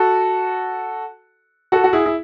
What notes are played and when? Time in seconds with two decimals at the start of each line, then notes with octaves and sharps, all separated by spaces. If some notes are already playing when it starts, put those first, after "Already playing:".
Already playing: F#4 A4
1.72 F#4 A4
1.84 F#4
1.93 E4 G#4
2.06 E4